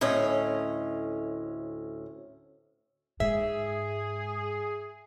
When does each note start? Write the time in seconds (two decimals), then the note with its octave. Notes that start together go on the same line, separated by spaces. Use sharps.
0.01 D2 A2 C#4 D#5
3.20 G#2 G#4 E5